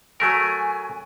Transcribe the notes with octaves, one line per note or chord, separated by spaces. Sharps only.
F#3 A3 A#4 G#5